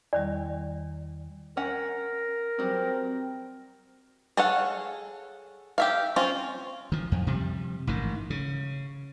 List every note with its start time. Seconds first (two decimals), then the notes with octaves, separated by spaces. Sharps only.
0.13 E2 D#3 G3 D5
1.57 C#4 A#4 F#5
2.59 F#3 G3 C4
4.37 G#4 A4 C#5 F5 F#5
5.78 G4 E5 F5
6.16 C4 C#4 F4
6.92 D#3 F3
7.12 F2
7.27 C3 F3 G3
7.87 A1 G#2 D#3
8.30 C#3